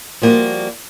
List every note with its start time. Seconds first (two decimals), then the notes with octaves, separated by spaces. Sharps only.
0.22 F3 G3 A#3 B3 F4 F#4